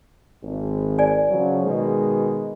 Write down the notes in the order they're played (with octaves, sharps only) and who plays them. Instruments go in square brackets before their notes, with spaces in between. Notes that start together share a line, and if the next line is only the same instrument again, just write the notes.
[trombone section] G#1
[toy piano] D5 G#5
[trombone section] C#3 F3 F#3
B2 D#3 G#3